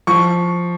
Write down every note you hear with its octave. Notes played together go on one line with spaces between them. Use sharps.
F3 C#6